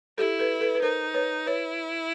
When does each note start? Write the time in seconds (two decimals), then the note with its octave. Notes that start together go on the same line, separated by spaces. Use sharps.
0.18 E4 G4 A4
0.39 A4 B4
0.61 A4 B4
0.75 B4
0.82 D#4 A#4 C5
1.14 B4 C#5
1.46 E4 B4 C#5